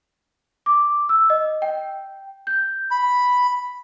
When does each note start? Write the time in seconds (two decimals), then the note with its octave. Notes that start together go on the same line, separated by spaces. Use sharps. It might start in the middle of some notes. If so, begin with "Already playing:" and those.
0.66 D6
1.09 E6
1.30 D#5
1.62 G5
2.47 G6
2.91 B5